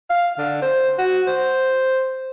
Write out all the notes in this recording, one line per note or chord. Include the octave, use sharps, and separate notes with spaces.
F5
D3
C5
F#4
C5